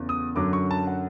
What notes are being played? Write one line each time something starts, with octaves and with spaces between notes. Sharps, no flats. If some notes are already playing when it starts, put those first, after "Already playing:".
Already playing: E2 C#3 E3 A3 C#4
D#6
F#2 D3 F#3 D6
C#6
A5
F#5